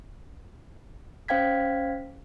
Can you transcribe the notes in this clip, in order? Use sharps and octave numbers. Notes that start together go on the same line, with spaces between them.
C#4 C5 F5 G5 G#6 B6